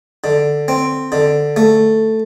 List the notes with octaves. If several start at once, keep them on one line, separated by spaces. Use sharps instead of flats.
D3
C4
D3
A3